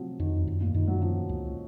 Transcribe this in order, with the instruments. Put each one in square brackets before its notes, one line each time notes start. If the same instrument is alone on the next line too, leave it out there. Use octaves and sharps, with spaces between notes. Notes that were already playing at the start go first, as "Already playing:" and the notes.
Already playing: [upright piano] C3 F3 F#3 [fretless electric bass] C4
[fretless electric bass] F2 [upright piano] D#3
[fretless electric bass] F#2
[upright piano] A#2
[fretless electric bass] F#2 [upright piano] D#3
[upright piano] F#3
[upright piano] F3 [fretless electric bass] C#4
[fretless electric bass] C#2